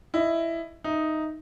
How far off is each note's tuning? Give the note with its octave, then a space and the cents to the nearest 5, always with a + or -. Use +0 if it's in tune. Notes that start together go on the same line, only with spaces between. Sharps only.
E4 +10 D#5 +0
D#4 +0 E5 +0